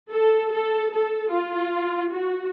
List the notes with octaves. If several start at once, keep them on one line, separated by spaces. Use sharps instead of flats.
A4
A4
A4
F4
F#4